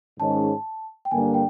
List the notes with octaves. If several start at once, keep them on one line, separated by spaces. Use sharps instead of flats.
G#2 D#3 G#3 C#4 A5
G5
G2 D3 G3 A#3 D4 G#5
G5